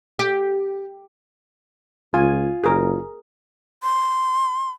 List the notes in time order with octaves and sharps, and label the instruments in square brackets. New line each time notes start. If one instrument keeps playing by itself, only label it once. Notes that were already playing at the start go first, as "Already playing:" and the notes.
[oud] G4
[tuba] C#2 [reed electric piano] F4 [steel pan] G#5
[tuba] F#1 [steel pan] G#4 A#4
[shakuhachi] C6